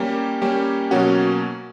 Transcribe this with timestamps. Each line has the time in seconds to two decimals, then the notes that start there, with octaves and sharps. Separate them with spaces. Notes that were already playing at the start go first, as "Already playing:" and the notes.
Already playing: G3 A#3 C#4 G4
0.42 G3 A#3 C#4 G4
0.91 B2 F#3 A#3 C#4 F#4